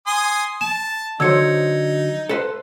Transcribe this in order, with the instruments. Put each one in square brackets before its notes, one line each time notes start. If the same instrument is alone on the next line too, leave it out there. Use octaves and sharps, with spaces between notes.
[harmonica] G#5 C6 D#6
[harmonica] A5 [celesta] E7
[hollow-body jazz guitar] D3 F#3 C5 [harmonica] D#4 [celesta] E6 G#6 C#7
[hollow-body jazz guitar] A4 B4 C5